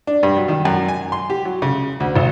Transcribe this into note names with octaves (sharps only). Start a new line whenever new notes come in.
D4
G2
F#3
D#3
F#2
G#5
C6
G4
F#3
C#3
D2
G#1